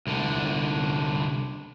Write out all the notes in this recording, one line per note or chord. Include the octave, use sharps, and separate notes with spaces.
C2 D3